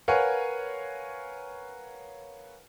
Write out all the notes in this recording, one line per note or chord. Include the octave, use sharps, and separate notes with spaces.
A#4 B4 C#5 F5 F#5 G#5